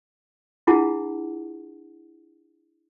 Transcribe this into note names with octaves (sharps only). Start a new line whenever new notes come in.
D4 E4 F4 G#4 F#5 A5